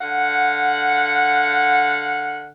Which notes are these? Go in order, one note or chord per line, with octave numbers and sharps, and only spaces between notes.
D3 F5 F#5